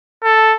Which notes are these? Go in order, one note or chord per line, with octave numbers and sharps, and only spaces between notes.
A4